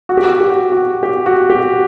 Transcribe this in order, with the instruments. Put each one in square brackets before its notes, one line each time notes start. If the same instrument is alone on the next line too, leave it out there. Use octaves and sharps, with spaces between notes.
[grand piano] F#4
G4
F#4
G4
F#4
G4
F#4
G4